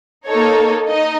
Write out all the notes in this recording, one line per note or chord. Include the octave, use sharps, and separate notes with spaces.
A#3 D#4 A4 C#5
D#4 D#5